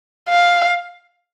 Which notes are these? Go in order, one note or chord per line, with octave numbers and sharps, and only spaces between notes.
F5